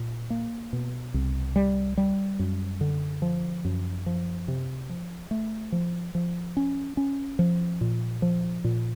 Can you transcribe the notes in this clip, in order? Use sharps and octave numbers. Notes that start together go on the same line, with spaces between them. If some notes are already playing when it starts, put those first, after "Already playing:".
Already playing: A#2
A#3
B2
C2
G3
G3
F#2
D3
F3
F#2
F3
C3
F3
A3
F3
F3
C#4
C#4
F3
A#2
F3
A#2